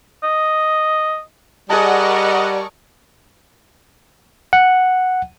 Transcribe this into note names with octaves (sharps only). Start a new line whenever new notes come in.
D#5
G3 G#4 A#4 D5 D#5 F#5 A5 C#6
F#5